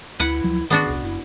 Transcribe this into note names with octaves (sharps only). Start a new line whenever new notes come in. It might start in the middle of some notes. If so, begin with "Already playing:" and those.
D2 E4 B4 F#5
D2 F3 F#3
D#3 B3 D4 F#4 G#4
E1 C2
F#1 E4